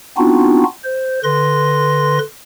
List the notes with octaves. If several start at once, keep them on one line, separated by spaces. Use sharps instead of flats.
B3 C4 D4 D#4 F4 F#4
C5
D3 B4 C6 A#6